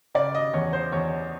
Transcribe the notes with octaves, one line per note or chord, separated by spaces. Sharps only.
C#3 D5
D#5
E2 C#5
C5
E2 C#5